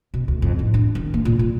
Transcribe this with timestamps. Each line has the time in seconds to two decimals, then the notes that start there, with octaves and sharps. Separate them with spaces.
0.14 B2
0.28 D2
0.42 F2
0.59 A2
0.74 D4
0.95 D#3
1.14 A#3
1.25 A#2
1.39 A#2